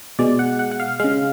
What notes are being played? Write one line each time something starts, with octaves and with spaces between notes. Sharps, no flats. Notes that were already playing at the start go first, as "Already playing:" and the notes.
B2 G#3 D5
F#5
F#5
F#5
F5
C#3 G#3 F5